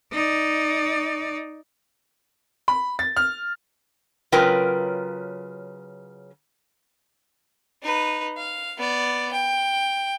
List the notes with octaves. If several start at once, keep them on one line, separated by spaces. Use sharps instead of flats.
D#4 D5
B5
A6
F6
C#3 F#3 F4 A#4 B4 G5
D#4 B4
F5
B3 D5
G5